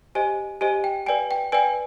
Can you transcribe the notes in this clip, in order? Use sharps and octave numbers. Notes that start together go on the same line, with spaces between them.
G4 C5 D#5 G#5
G4 C5 D#5 G#5
G5
B4 D5 G5 G#5
G5
B4 D5 G5 G#5